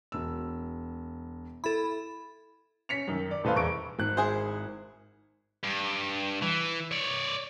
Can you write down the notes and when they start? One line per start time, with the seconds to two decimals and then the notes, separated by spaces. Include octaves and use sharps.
0.12 E1 E6
1.64 E4 A4 B5
2.89 C#4 B6 C#7 F7
3.08 F#2 D#3
3.31 D5
3.43 D#1 A2 A4 B4 C5 F5
3.56 E1 E2 C#6 D7
3.99 G#1 F#6
4.17 E4 G#4 C5
5.63 G2
6.42 E3
6.91 C#5 D5